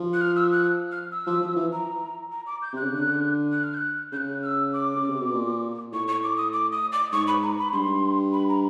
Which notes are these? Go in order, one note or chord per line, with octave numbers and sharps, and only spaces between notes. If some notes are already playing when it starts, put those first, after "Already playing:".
Already playing: F3
F#6
F6
E6
F#6
F6
E6
F3
F3
E3
A#5
A#5
D6
G6
C3 F#6
C#3
D3
F#6
F6
G6
F#6
C#3 F#6 G6
F6
E6
D6
C#3
C3
B2
A#2
A2 C#6
C#6
D6
D#6
D6
D#6
D6
G#2 C#6
B5
A#5
B5
G2 C6
B5
A#5